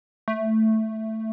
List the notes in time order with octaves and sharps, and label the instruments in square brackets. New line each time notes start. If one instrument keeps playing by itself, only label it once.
[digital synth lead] A3